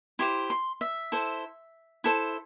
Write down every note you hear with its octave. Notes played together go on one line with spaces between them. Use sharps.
E4 G4 C5 C6
C6
E5
E4 A4 C5
E4 A4 C5